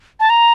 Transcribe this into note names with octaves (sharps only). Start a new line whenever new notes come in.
A5
A#5